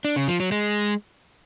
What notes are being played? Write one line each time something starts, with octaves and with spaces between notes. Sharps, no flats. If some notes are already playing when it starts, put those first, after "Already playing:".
D4
C#3
F3
F#3
G#3